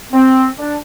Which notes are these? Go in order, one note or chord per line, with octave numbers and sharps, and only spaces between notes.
C4
D4